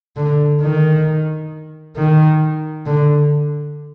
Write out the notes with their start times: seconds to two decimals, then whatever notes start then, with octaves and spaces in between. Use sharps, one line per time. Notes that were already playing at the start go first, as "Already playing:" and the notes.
0.17 D3
0.61 D#3
1.97 D#3
2.86 D3